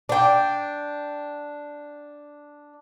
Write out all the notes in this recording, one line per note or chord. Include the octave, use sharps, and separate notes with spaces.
D4 G5